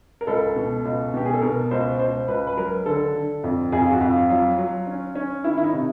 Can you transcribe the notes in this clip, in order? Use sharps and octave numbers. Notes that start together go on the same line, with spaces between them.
A#4
C#2 A4
B2
C#2
B2 G4
G#4
A4
B2 A#4
C#2 C5
C#2 C5
C#2 B4
B4
F#3 A#4
D3 A4
D3
F2
F2 G#4
F4
F#4
F2
F4
F#3 F4
F#3
C#4
C#4
D#3 E4
E4
D#4
C3